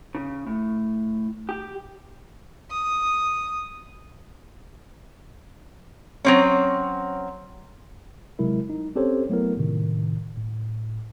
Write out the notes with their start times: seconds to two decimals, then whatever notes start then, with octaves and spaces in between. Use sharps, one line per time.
0.15 C#3
0.47 A2
1.49 G4
2.71 D#6
6.25 F#3 C4 C#4
8.39 C3 F#3 G#3 E4 A#4
8.70 D#4
8.95 C4 C#4 G4 A4 C5 C#5
9.30 F#3 A3 B3 E4 A#4
9.57 A2 C3 D#3
10.38 A2